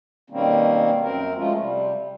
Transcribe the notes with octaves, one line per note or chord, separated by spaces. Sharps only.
B2 D#3 G3 A#3 C4 C#4
F#2 C4 A#4
F3 G#3 A3 C#4 F4
C3 G3